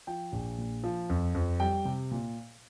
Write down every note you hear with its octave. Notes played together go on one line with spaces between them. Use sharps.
F3 G5
A#1
A#2
F3
F2
F2
G3 G5
C3
A#2